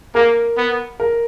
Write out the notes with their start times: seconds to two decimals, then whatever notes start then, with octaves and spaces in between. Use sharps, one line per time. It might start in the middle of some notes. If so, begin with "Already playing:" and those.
0.15 A#3 A#4
0.57 B3
1.00 A#4